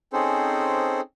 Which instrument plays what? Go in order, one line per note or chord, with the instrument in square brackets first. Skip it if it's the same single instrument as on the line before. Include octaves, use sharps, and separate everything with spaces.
[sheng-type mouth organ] C4 C#4 D#4 G#4 A4 C5